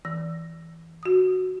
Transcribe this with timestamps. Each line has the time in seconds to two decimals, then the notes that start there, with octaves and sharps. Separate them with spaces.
0.05 E3 A#6
1.03 F#4 D#6